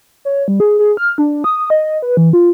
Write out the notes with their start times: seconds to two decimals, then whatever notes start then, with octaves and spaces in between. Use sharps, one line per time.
0.25 C#5
0.48 G3
0.60 G#4
0.79 G#4
0.97 F6
1.18 D4
1.44 D#6
1.70 D#5
2.02 B4
2.17 E3
2.33 F4